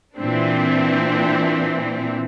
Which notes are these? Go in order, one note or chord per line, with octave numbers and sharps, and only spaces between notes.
A#2 E3 C4 D4